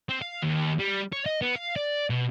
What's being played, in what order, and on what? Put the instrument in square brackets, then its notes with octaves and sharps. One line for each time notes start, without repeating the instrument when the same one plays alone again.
[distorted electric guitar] C4
F5
D#2
G3
C#5
D#5
B3
F5
D5
B2